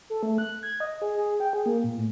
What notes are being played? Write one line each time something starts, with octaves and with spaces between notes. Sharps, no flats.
A4
A3
F#6
G#6
D#5
G#4
G#4
G5
G#4
A#3
A#2
A2